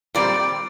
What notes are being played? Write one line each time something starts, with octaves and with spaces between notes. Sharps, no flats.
A#2 G3 C4 D5